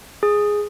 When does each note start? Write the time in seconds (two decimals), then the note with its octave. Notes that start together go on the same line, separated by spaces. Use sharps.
0.23 G#4